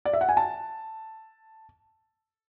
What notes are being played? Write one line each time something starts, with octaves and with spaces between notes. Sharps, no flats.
D5
E5
F#5
G#5
A5